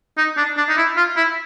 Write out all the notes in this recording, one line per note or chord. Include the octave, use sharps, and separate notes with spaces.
D#4
D4
D4
D#4
E4
F4
E4